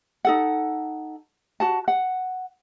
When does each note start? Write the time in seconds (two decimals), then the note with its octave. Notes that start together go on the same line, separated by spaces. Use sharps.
0.25 D#4 A4 F#5
1.60 F#4 F#5 A5
1.88 F#5